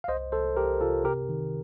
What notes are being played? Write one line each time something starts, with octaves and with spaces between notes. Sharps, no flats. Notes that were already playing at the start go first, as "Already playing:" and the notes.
F5
C2 C5 D#5
C2 A4 C5
C2 G4 A#4
C3 F4 A4
C3 G4 A#4
D#3